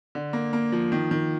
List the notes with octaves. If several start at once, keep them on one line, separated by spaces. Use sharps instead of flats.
D3
A#3
A#3
F3
D#3
D#3